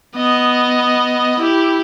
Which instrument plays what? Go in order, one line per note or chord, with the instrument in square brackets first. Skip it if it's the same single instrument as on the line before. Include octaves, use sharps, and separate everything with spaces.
[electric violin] B3 D#5
E4 G4